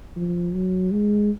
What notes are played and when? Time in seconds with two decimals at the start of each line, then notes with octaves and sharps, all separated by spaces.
0.17 F3
0.54 F#3
0.92 G#3